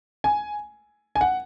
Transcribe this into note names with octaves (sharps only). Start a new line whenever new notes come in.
G#5
G#5
F#5